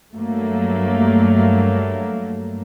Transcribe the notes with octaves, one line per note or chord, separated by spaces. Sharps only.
G2 F#3 A3 A#3